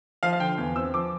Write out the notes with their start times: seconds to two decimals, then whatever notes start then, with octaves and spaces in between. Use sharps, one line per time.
0.23 F3 F5
0.33 F5
0.40 D3 G5
0.58 E2
0.76 C4 E6
0.94 F3 D6